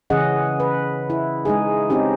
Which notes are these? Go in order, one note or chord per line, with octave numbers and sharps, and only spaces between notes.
C#3 E3 C#4 G#4 D#5 F#5
B4
E4
G#3 D#4 G#4
C4 C#4 D#4 G4